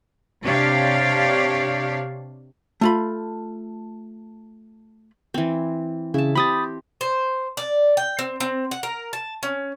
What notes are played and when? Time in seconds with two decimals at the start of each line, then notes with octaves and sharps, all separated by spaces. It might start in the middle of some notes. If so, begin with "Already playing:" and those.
0.43 C3 D4 G4 C#5 D5 F5
2.81 A3 F4 B5
5.34 E3 C4
6.14 C#3 E4 A5
6.35 C4 G4 B5 D#6 A6
7.01 C5
7.57 D5
7.97 G5
8.19 C4
8.40 C4
8.71 F#5
8.83 A#4
9.13 A5
9.43 C#4